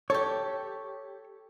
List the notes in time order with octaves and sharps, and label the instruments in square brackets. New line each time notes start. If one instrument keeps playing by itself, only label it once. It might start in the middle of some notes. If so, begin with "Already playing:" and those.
[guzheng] G4 A4 [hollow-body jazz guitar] C#5